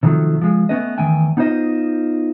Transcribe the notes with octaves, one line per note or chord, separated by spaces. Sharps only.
C3 D#3 F3 F#3 A3
F3 G#3
A3 B3 C#4 B4 D#5
E2 D#3 A3 G5 G#5
B3 D#4 F4 C5 D#5